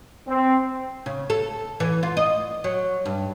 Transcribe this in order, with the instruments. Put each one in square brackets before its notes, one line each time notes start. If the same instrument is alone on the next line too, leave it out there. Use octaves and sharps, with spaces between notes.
[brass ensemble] C4
[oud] C#3
A4
E3
F4
D#5
F#3
G2